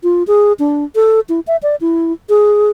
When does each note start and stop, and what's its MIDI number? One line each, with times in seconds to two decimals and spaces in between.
0.03 0.23 65
0.27 0.53 68
0.59 0.84 62
0.95 1.20 69
1.29 1.40 64
1.47 1.57 76
1.63 1.76 74
1.81 2.13 64
2.29 2.70 68